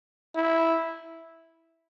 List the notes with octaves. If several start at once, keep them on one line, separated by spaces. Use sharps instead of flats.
E4